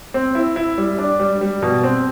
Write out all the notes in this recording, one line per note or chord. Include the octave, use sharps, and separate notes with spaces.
C4
E4
E4
G3
D4
G3
G3
B2
C4